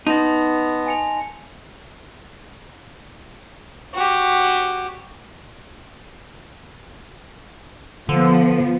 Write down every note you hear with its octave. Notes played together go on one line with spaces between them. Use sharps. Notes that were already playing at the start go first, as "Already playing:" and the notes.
B3 D#4 A5 C6 A#6
G#5 C#7 F7
F#4 G4
D3 F3 B3